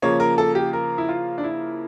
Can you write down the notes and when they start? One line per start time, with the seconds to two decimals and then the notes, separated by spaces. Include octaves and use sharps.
0.02 C#3 F3 A#3 C#5
0.20 A#4
0.38 A4
0.55 G4
0.73 A#4
0.98 E4
1.09 F4
1.38 D4
1.44 E4